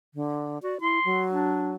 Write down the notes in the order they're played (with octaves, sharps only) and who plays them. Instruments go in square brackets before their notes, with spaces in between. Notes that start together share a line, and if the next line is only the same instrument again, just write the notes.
[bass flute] D3
[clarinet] F#4 [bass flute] D5
[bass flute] E4 [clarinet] C6
[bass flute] F#3
[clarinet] D4